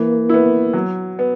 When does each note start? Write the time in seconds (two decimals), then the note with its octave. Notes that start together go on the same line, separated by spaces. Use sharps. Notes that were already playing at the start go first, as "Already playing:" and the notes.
Already playing: E3 A#3
0.29 B3 E4
0.73 F#3
1.19 B3